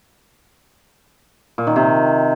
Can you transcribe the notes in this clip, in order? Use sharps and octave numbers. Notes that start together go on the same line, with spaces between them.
A#2
D#3
C3